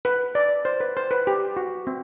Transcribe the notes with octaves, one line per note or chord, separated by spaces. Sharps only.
B4
D5
C5
B4
C5
B4
G4
F#4
C4